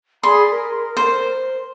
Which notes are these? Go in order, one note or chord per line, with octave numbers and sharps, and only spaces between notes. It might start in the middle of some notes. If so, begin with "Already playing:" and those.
G#4 D5 B5 C6
A#4
C5